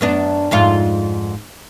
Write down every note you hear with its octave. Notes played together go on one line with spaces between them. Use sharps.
F#2 B3 D4
F2 G#2 F4